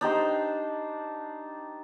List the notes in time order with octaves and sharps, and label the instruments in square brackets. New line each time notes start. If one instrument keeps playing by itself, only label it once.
[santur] D4 D#4 G4 C5